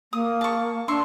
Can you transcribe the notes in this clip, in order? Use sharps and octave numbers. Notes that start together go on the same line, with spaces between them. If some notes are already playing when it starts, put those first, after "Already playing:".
A#3 D#6
A5 C#6
D4 E5 C6 C#6